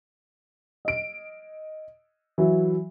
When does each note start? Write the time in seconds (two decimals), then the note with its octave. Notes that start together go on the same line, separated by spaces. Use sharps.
0.85 D#5 D7
2.38 E3 F#3